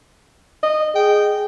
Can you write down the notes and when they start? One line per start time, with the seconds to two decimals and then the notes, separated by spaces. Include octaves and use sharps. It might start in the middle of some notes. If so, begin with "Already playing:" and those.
0.63 D#5
0.95 G#4 G5